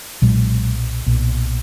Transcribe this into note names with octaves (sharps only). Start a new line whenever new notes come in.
B1 A#2 F#3 G#3
B1 A#2